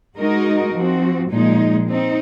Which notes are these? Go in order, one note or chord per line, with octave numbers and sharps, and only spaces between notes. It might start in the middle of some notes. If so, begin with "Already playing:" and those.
G#3 D#4 F#4 A#4 D#5
F3 C4 F#4
A#2 F3 G#3 D#4
C4 D#4